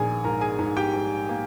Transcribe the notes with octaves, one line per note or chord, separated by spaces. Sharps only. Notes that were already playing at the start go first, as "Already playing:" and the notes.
Already playing: A#1 D#3 G#4 A#4 G#5
G#2 A#4 A#5
G#4 G#5
G#2
G4 G5
G#2
A#3